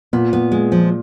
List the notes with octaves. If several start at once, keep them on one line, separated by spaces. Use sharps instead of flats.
A#2 B3
B3
G#3
F3